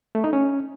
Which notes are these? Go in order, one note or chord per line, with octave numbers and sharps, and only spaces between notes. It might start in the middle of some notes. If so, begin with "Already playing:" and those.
A3
D#4
C#4